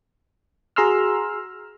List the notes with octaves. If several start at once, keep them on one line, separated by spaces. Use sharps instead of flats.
F#4 G#4 A#5 C6 E6 F6